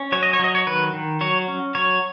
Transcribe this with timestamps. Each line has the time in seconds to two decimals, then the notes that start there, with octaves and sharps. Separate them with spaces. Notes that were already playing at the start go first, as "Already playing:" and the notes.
Already playing: C#4
0.12 F#3 C#5
0.23 D#5
0.33 C#5
0.39 F#3 D#5
0.55 C#5
0.67 D#3 B4
0.93 D#3
1.21 F#3 C#5
1.48 C#4
1.75 F#3 C#5